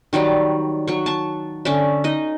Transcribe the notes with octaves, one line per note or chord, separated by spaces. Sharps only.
D#3 F#3 G3 D5
F#3 C#6
A5 C#6
D3 C#4 D5 E5
D#4 D#5